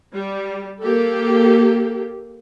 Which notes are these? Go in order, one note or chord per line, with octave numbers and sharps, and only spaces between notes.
G3
A#3 G4 A4